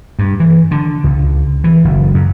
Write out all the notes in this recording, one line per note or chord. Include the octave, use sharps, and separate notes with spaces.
G2
E3
D3
C#2
E3
F#1
F#2